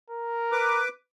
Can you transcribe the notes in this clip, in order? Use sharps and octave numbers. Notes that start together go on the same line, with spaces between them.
A#4
B4 D6